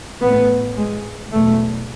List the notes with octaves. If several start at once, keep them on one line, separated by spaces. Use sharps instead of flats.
A1 A2 B3
G#3
F#1 E2 B2 A3